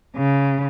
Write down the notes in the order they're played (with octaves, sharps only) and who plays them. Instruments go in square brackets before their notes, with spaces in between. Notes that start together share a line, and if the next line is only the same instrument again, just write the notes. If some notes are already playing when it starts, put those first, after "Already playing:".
[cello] C#3